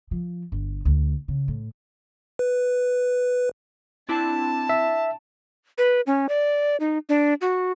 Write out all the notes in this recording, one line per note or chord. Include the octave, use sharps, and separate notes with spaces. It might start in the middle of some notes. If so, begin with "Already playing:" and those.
F3
G1
D2
C#3
A2
B4
C4 D4 E4 A5
E5
B4
C#4
D5
D#4
D4
F#4